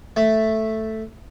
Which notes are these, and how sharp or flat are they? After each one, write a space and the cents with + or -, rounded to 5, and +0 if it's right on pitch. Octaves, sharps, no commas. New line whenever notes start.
A3 +0 E5 +0